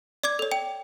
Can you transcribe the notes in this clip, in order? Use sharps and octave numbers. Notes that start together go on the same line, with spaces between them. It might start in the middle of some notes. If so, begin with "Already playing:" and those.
D5 D6 G#6
A4 C#5
G5